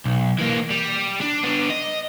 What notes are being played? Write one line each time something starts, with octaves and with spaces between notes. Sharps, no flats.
B1
E3 A#3
G3
D4
B3 D4
D#5